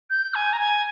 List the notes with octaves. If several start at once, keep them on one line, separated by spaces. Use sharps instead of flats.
G6
G#5
A#5
G#5